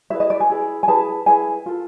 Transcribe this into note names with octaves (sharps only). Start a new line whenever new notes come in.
E4 G#4 B4 E5
D#5
D5
G#5
E4 G#4 B4
G#5
E4 G#4 B4 A5
E4 G#4 B4 G#5
F4 A4